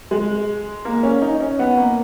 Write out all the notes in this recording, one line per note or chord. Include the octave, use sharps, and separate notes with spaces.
G#3
A#3
C#4
D#4
C#4
B3
A#3